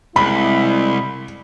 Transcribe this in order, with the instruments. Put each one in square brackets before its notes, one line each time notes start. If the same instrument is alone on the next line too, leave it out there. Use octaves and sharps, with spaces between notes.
[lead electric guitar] C2 [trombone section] G#3 E4 [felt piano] B5